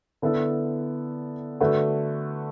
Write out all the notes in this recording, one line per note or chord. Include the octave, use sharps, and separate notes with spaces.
D3 B3 E4 A4
D3 A3 F#4 B4